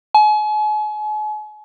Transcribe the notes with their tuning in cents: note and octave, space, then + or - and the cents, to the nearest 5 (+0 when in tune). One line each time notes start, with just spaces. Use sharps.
G#5 +40